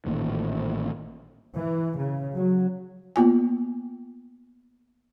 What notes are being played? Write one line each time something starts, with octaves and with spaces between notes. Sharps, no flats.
A1 A#2 D#3
E3
C#3
F#3
A#3 B3 F4 G#5